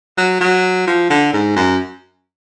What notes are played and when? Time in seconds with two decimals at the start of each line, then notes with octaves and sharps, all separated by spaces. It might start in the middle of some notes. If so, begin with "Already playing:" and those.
0.17 F#3
0.41 F#3
0.87 F3
1.10 D3
1.33 G#2
1.56 F#2